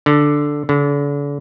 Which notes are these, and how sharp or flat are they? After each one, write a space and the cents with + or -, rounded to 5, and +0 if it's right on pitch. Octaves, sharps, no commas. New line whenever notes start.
D3 +0
D3 -40